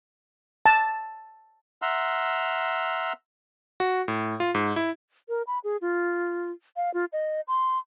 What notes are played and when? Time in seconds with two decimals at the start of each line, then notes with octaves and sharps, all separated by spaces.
0.66 A5
1.82 E5 F#5 A#5 C6 E6 F6
3.80 F#4
4.08 A2
4.40 F4
4.55 G#2
4.76 E4
5.29 A#4
5.47 B5
5.64 G#4
5.81 F4
6.76 F5
6.94 F4
7.13 D#5
7.48 C6